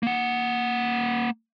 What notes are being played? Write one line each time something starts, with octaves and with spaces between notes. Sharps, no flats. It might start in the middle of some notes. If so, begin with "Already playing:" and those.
A#3 F#5